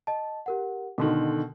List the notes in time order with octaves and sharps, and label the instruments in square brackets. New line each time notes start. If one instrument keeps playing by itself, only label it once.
[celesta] D#5 A5
G4 A#4 F#5
[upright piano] B2 D3 D#3 [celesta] F#4 A4 C6